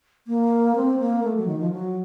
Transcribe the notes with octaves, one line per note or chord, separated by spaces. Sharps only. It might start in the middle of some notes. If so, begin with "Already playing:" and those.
A#3
C4
A#3
A3
F#3
D#3
F3
F#3